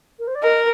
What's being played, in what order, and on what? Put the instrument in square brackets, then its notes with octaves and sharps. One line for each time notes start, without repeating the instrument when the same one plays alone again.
[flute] A#4
C5
D5
[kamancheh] A#4 [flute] D#5